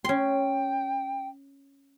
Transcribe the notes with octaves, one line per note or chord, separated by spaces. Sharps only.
C#4 G5 C6